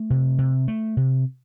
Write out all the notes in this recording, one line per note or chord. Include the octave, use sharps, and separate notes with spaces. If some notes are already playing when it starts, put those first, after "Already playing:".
Already playing: A3
C3
C3
A3
C3